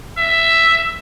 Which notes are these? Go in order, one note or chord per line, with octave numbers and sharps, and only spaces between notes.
E5